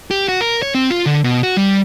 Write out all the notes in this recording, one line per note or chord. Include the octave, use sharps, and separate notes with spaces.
G4
F#4
A#4
C#5
C4
F4
D3
B2
F#4
G3